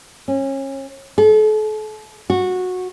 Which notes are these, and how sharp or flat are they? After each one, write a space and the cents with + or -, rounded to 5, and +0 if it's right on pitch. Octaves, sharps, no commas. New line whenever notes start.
C#4 -30
A4 -40
F#4 -15